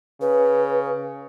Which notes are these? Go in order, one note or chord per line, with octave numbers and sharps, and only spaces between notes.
C#3 B4